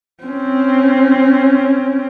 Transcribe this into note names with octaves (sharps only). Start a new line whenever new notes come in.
C4 C#4